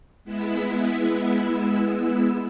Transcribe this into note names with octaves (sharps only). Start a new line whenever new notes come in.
G#3 B3 E4 E5